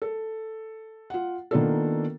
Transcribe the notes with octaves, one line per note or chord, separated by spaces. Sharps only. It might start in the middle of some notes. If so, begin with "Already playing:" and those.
A4
F4 F#5
D#3 A#3 B3 D4 F4 A4